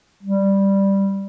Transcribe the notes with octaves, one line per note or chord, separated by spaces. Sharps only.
G3